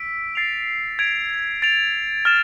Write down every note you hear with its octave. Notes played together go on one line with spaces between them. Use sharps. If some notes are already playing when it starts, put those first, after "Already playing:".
Already playing: E6 B6 D7
A6 C7 F7
G#6 D7 F7
A6 D7 F7
F6 A6 E7